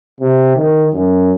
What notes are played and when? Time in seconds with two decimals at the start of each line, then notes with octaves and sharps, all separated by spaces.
0.20 C3
0.56 D#3
0.93 F#2